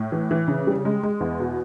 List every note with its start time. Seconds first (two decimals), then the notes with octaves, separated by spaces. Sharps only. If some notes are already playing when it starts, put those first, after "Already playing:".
Already playing: A2
0.12 E3
0.31 E3
0.48 C#3
0.67 G3
0.85 G#3
1.03 G#3
1.21 E2
1.40 B2